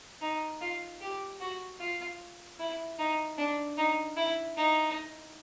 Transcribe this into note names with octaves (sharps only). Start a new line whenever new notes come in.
D#4
F4
G4
F#4
F4
E4
D#4
D4
D#4
E4
D#4